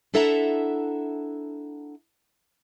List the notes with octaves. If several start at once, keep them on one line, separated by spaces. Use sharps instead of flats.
D4 E4 A4 E5 F#5 A#5